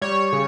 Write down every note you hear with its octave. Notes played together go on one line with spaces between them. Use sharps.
G3 C#5
C#3